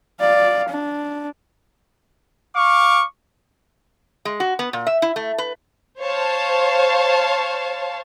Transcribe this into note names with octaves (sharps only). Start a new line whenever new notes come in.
D5 F5
D4
F5 C#6 D6
G#3
F#4
B3
A#2
E5
E4
A3
B4
C5 C#5 F5 A5